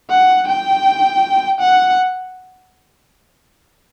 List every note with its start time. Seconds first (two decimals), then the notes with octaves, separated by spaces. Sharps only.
0.10 F#5
0.48 G5
1.60 F#5